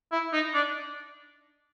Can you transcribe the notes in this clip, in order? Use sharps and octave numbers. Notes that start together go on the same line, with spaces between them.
E4
D#4
D4